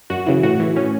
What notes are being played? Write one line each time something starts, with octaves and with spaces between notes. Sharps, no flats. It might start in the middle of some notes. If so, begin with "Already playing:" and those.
F#2 F#4
C#3 E3
A2 F#4
E3
A2 C#4